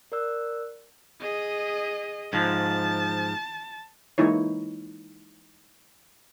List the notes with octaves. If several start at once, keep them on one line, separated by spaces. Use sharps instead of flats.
A#4 D5 E6 F#6
G#4 D#5
G#2 F3 A5
E3 G#3 A#3 D#4 E4 C#5